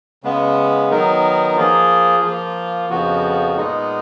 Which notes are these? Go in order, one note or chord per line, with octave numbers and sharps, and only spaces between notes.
C#3 G#3 B3
D#3 F#3 B3 D#4 A#4
F3 A#3 F4 G#4
F3 A#3 F4
F2 C#3 F3 B3 F#4
A#2 G#3 B3 D#4